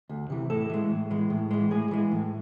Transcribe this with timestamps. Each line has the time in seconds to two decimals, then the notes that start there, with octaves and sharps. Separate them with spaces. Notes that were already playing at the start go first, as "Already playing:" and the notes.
0.09 D2
0.30 C3 E3
0.50 A2 A4
0.70 E3 G#3
0.90 A2
1.11 E3 G#3
1.30 A2
1.51 E3 G#3
1.71 A2 G#4
1.91 E3 G#3
2.12 A2